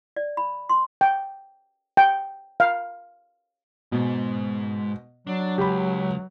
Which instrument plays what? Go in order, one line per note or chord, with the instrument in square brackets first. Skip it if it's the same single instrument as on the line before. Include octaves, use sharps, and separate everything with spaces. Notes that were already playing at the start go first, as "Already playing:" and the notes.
[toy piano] D5
B5
C6
[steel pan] G5
G5
F5
[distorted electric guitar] G#2 [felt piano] B2
[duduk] F#3 [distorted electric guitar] D4
[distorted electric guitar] C#2 [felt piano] G4 B5